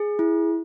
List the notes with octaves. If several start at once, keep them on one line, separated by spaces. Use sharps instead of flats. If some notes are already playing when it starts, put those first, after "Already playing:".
Already playing: G#4
E4